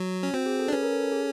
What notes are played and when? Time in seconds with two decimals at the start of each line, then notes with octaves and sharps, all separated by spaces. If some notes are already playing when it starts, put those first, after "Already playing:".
Already playing: F#3
0.23 C#4
0.33 C4 F#4
0.46 G#4
0.59 A4
0.68 D4
0.72 C#4 B4
0.83 A#4
0.92 A4
1.03 A4
1.12 G#4